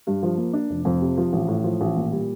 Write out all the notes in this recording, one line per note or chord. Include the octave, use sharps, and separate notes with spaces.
G2
F3
A#3
D4
F1
F2
C3
F3
A1
A2
F3
A1
A#2
G3